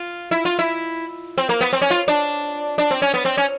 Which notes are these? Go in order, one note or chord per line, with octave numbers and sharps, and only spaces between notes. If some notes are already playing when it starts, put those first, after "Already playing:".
Already playing: F4
E4
F4
E4
C4
A#3
B3
C4
C#4
F4
D4
D4
C4
C#4
B3
C4
C#4